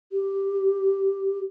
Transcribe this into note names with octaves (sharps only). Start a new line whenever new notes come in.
G4